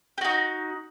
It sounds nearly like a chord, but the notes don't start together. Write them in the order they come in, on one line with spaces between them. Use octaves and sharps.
G4 F#4 D#4